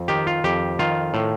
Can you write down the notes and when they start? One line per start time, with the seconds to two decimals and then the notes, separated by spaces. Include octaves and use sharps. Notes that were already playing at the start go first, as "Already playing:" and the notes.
Already playing: F2
0.08 D#3 G4
0.27 F4
0.44 F2 G4
0.79 D#3 F4
1.14 A2